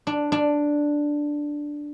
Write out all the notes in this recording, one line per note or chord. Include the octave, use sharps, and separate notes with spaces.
D4
D4